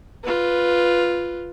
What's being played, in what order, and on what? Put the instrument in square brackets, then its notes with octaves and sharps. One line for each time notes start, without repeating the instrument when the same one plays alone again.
[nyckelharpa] F4 B4